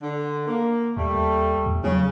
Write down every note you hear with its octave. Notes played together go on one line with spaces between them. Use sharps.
D3
A#3
D#2 G3 A3
E2
C#3 F#3